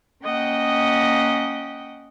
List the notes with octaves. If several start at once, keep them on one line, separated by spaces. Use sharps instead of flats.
A#3 C#4 D#5 F#5 G5